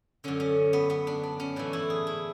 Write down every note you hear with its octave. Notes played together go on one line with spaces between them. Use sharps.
F#2 D3 C#4
C#4
B3
B3
D4
D4
C#4
A2 E3 D4
E4
G#4
E4